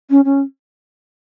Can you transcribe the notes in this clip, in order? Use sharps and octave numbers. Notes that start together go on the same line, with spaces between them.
C#4
C#4